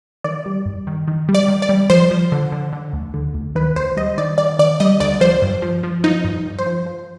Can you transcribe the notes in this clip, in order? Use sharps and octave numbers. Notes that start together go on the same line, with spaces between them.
D#3 D5
G3
G2
D#3
D#3
G3
D5
D#3
D5
G3
F3 C5
F3
D3
D3
D3
D2
D3
D2
D#3 B4
D2 C5
G3 D#5
D#3 D5
D#3 D5
D#3 D5
G3 D#5
D2 D5
F3 C5
G2
F3
F3
F3 D#4
G2
G2
C5
F3
F3